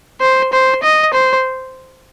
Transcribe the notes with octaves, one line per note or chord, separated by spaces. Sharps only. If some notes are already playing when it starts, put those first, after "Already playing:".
C5
C5
D#5
C5